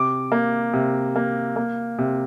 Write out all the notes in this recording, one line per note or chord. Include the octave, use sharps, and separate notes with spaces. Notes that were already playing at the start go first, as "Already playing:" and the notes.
Already playing: C3 D6
A#3
C3
A#3
A#3
C3